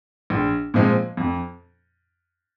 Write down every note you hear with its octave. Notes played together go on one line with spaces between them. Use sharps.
A#1
A#2 F3 G#3 C4
F2